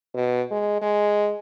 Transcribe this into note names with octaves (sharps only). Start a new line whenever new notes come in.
B2
G#3
G#3